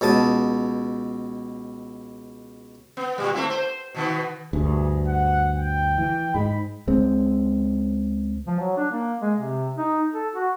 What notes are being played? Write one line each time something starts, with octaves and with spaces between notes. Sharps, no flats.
C#2 B2 A5 D#6
B3
A#2 G3
A3 C4 E4
C5
B2 D#3 B3
D2 G2 G#4
F#5
G5
E3
G#2 G#3 B5
C#2 G#3 C4
F3
F#3
D4
A#3
G#3
C3
D#4
A4
F#4